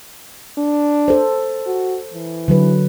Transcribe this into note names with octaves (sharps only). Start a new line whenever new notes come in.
D4
A4 C5
F#4
E3
D3 F#3 B4